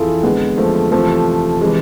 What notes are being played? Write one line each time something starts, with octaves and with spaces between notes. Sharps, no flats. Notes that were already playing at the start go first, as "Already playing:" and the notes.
Already playing: F2 E3 E4 F4 G#4 A4
F2 D3 G#3 B3
F3 A3
F2 C3 E3 F3 A3
C3 E3 G#3